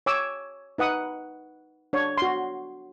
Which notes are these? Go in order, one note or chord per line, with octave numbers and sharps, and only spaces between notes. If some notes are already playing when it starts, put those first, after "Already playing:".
C#5 G#5 D6 E6
D#4 B4 F#5 D#6
D4 C#5
F#4 C6